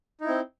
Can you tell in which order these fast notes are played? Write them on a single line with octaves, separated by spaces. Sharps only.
D#4 E4 C4